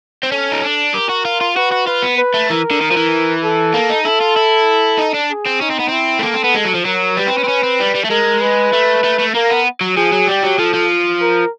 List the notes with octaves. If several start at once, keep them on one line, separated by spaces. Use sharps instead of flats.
C4
C#4 A4
D#4
D4
G4 A#4
F#4
F4
F4
F#4 B4
F#4
F4 B4
B3
B4
A3
E3 A#4
D3
D#3
F3
E3
A4
A#3
D#4
E4 A4
F4
E4
D#4
D4
G#4
C4
C#4 D#4
C4
B3
C4 E4
A3
A#3 A4
C4
B3
G#3
F#3
F3
F#3 A#4
G3 B4
C4
C#4
C4
C#4
C4
G3
G3
A3
G#3 A#4
B4
A3
A3
A3
A#3 A#4
B3
F#3
F3 G#4
F#3
G3 G4
F#3
F3 A4
F3
A#4